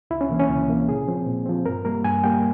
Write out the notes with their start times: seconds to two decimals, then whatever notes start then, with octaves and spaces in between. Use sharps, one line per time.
0.11 C#2 E4
0.21 C#4
0.29 C3 E3 A#3
0.40 C#4
0.49 C#2
0.68 C3 E3 A#3
0.88 A#2 G#4
1.07 F3 C4
1.26 A#2
1.46 F3 C4
1.65 G2 A#4
1.84 G3 A#3 A#4
2.04 G2 G#5
2.24 G3 A#3 G5